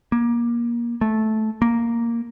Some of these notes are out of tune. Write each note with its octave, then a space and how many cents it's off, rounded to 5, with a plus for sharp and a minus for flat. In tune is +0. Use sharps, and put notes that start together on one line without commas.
A#3 +25
A3 -10
A#3 +0